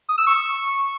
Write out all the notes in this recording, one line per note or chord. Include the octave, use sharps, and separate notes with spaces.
D#6
E6
C#6